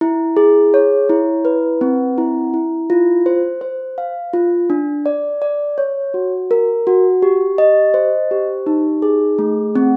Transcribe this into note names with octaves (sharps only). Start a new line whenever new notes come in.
E4
G#4
C#5
E4
B4
C4
E4
E4
F4
C5
C5
F5
F4
D4
D5
D5
C#5
F#4
A#4
F#4
G4
D#5
C5
G4
D#4
G#4
A3
C4